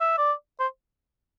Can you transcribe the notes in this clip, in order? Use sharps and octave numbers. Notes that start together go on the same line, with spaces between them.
E5
D5
C5